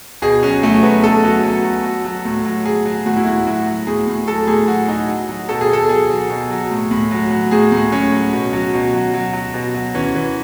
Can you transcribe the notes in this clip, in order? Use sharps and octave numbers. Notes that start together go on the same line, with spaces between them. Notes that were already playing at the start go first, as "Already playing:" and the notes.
B2 G#4
F#3 C#4
F#3 A3
F#3 B3
F#3 A4
F#3
F#3
F#3
F#3
F#3
A2
F#3
F#3 G#4
F#3
A2 F#4
E4
A2 F#4
F#3 F#4
F#3
A2 G#4
A2
F#3 A4
A2 G#4
F#3 F#4
F#3 D#4
F#3
F#3
B2 A4
G#4
B2 A4
F#3 G#4
F#3
B2
F#3
A2
A2
F#3
F#3
A2 G#4
A2
F#3 C#4
F#3
B2
F#3
B2
F#3
F#3
F#3
B2
F#3
E3 C#4
E3